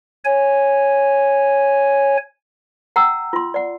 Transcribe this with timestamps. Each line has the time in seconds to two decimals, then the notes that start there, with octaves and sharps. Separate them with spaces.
0.25 C#5 G#5
2.96 F#5 G5 A#5 E6
3.33 F4 C6
3.54 D5 F#5